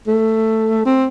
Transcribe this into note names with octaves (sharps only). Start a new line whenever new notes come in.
A3
C4